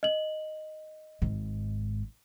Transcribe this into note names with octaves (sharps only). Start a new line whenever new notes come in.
D#5 F#7
G#1 G#2